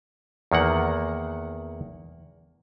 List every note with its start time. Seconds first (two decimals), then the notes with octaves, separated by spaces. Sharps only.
0.52 E2 D#3 A#3 F#5